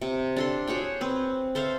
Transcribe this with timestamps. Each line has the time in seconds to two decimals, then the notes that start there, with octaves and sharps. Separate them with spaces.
0.01 C3
0.36 D4 A4 C6
0.67 F#4 G#4 C#5 G5
1.01 C4 B4
1.55 A4 C5 E5 F5